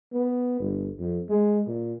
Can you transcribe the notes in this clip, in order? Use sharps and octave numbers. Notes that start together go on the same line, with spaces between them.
B3
G1
F2
G#3
A#2